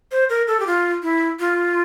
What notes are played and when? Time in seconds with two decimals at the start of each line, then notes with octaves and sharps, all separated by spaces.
0.12 C5
0.29 A#4
0.48 A4
0.60 G4
0.67 F4
1.03 E4
1.39 F4